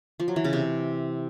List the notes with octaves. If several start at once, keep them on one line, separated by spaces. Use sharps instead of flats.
F3
F#3
E3
C#3
C3